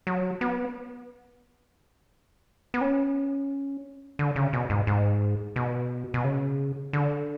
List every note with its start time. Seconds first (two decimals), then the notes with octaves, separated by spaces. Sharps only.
0.07 F#3
0.41 B3
2.74 B3
2.81 C#4
4.19 D3
4.36 C#3
4.53 B2
4.70 G#2
4.87 G#2
5.56 B2
6.14 B2
6.24 C#3
6.93 D3